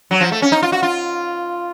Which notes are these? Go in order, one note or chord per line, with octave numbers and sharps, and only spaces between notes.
F#3
F3
A3
C#4
D#4
F4
F#4
F4